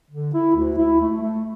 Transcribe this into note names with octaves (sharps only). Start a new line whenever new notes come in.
D3
E4
D2
E4
A3
A3